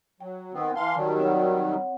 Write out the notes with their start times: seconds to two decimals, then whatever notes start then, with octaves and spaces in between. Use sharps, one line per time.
0.20 F#3 G5
0.53 D#3 B3 C4
0.76 E3 F5 G5 A5 C6
0.96 D#3 F#3 G3
1.20 C4 C#5 F#5